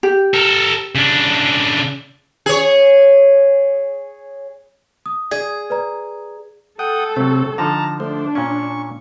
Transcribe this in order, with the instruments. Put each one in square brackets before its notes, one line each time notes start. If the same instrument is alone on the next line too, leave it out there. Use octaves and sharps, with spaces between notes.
[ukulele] G4
[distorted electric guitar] A4 A#4
C#3 D4
[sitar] G#4 C#5
[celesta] D#6
[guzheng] G#4 [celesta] D5
[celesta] B4 D5 A#5
[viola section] A4 [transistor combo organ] F#5 G5 D#6
[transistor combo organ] C3 C4 [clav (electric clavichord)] F#3 A3
[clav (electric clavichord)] D3 F3 D#4 [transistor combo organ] A5 A#5
[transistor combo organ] A3 C5 [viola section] D4
[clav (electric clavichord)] A#2 C#4 [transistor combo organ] C#6